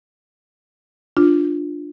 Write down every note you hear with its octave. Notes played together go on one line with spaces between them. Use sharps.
D4 F4